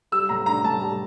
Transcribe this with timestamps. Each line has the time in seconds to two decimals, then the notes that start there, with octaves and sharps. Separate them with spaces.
0.12 G3 E6
0.29 A2 A#5
0.46 D4 A#5
0.64 A2 A5
0.81 G3